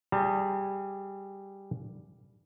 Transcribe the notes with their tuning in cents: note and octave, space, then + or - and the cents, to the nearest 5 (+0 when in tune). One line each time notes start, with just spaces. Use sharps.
G3 +0 G#4 +0 A5 +45